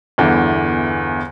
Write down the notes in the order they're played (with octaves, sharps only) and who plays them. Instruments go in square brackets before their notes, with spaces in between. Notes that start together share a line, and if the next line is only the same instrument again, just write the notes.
[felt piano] G1 E2 D3 E3